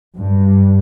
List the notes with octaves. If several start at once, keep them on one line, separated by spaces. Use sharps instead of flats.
G2